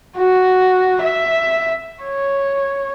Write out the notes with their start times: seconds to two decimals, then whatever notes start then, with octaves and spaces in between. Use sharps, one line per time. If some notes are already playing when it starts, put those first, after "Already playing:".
0.17 F#4
1.02 E5
2.03 C#5